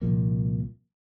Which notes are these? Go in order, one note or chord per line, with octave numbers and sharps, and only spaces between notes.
C2 A#2 F3 A#3